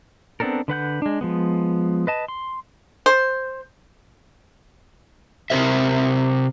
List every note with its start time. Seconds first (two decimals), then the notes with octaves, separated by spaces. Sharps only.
0.40 B3 C4 D4 A4 A#4
0.68 D3 B4 F#5 G6
1.02 G#3 D4
1.21 F3 G#3 B3
2.07 B4 D#5 A5
2.28 C6
3.06 C5
5.50 C3 C4 A#4 C5 E5